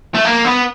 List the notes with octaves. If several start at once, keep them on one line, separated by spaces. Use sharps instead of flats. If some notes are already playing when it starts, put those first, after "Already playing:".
A3
A#3
B3